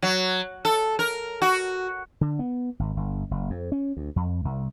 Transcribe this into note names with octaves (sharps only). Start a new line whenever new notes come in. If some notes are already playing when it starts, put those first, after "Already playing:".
F#3
A4
A#4
F#4
D3
B3
G#1
G1
F#1
F2
C#4
D2
F2
C2